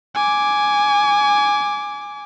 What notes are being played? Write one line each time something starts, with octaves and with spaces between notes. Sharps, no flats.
G#5 D6